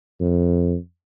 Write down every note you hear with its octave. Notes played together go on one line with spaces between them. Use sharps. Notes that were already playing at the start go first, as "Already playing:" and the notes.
F2